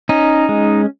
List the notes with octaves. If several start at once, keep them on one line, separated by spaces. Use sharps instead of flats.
C#4 D#4
G#3